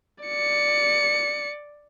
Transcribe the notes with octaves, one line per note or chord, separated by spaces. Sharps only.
D5 C#7